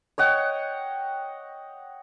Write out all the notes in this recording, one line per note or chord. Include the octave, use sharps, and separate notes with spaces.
C#5 D#5 F#5 G5